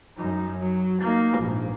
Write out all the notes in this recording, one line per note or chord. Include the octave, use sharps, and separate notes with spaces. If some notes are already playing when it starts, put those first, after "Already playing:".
F#2 D#4
F#3
A#3 D#4
A#1 G#2